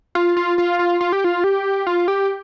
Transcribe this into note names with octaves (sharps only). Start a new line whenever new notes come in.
F4
F4
F4
F4
F4
G4
F4
G4
F4
G4